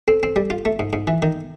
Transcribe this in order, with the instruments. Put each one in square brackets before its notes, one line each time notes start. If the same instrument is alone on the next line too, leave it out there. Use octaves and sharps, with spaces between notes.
[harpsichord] C4 [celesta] A4
[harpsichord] C4
G3
F4
A3
G#2
G#2
E3
D#3